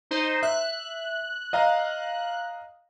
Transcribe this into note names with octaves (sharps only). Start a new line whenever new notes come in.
D#4 C5
E5 F#6
D#5 F5 A#5